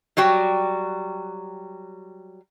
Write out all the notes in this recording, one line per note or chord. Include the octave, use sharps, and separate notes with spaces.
F#3 G3 F#4 G5